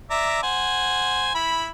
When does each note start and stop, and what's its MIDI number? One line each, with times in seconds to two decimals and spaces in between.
0.11 0.43 74
0.11 0.43 76
0.11 0.43 82
0.43 1.33 72
0.43 1.33 78
0.43 1.33 80
1.35 1.69 64
1.35 1.69 83